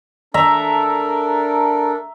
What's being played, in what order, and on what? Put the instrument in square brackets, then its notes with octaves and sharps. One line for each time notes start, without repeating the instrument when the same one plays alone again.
[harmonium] D4 A4 A#4 [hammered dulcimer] E5 A#5